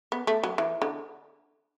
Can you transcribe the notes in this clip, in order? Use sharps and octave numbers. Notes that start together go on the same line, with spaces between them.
B3
A3
F#3
E3
D3